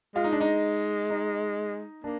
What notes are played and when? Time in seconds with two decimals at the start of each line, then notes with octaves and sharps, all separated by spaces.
0.15 G#3 F4
0.24 D#4
0.32 D4
0.41 D#4
1.10 D#4
2.04 A#3 D4